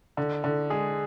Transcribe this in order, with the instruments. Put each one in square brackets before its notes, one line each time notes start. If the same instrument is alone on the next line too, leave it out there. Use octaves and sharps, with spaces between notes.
[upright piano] D3
D3
[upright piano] G#3 [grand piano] G#4